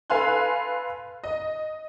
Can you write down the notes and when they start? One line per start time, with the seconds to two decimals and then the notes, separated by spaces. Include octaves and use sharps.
0.10 A4 B4 F5 G#5 C6 F#6
1.24 D#5